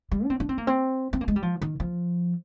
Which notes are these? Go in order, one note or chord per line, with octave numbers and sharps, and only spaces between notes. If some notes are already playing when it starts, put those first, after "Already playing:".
G3
D4
C4
D4
C4
A#3
C4
C4
A#3
G#3
G3
F3
D#3
F3